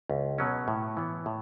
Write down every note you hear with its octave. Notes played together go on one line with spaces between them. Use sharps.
C#2
B2 F#3 C#4
A2
E3 B3
A2